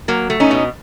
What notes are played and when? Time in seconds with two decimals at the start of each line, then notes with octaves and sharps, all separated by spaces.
0.08 F#3 A#3
0.30 A3
0.40 C#4 D#4
0.51 B2